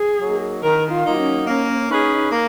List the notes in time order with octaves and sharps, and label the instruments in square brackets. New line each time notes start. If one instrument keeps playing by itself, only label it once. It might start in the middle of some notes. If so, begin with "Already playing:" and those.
Already playing: [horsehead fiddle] G#4
[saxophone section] F#3 A#3 D#4
[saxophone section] D#3 [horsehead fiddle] A#4
[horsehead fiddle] F4
[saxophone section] F#3 A#3 D#4
[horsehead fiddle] C#4
[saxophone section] A#3 [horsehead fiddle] C#4
[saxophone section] C#4 G#4 B4 [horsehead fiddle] D#4
[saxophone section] A#3